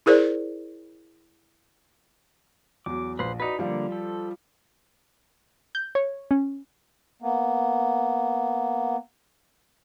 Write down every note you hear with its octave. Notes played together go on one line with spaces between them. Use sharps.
E4 G#4 A#4 C5 D5
E2 F#3 D6
A#1 B4 C5
D#4 F#4 B4 D5
D3 F3 G3 A#3
A4
G6
C#5
C#4
A#3 B3